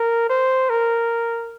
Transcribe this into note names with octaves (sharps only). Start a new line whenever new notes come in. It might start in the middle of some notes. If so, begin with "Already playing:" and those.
Already playing: A#4
C5
A#4